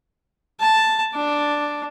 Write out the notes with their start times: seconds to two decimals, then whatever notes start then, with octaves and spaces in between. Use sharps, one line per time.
0.60 A5
1.14 D4